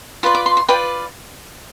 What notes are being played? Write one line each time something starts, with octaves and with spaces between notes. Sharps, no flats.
F4 B4 D5 C6
D6
C6
C6
F4 B4 D5 G5